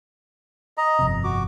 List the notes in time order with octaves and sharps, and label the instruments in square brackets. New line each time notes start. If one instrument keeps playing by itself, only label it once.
[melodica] D#5 A#5
[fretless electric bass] G1 F2 C3
[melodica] F#4 D6